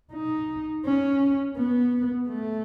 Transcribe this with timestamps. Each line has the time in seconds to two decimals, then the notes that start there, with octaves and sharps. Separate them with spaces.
0.13 D#4
0.85 C#4
1.56 B3
2.29 A3